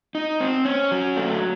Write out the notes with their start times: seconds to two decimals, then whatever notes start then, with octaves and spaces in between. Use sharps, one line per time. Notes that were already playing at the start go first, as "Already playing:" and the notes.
0.15 D#4
0.41 C4
0.65 C#4
0.91 F#3
1.17 A3